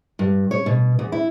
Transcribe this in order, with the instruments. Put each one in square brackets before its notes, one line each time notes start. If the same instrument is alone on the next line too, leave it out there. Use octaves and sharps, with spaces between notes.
[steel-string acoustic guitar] G2
C#5
B2
E2
E4